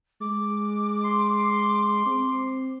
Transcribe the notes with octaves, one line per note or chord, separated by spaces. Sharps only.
G#3 D6
C6
C4